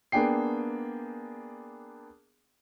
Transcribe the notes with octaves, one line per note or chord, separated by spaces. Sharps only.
A#3 B3 D4 G#4 G5 C7